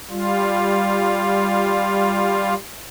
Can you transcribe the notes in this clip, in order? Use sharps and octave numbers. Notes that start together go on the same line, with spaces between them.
G3 F4